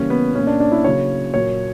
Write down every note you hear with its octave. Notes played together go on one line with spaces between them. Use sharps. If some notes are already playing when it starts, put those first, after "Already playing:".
Already playing: C#3 E3 G3 A#3 C#4
B3
A#2 A#3 C#4
D4
D4
E4
C#3 F#3 A#3 C#5
A#2 F#3 A#3 C#5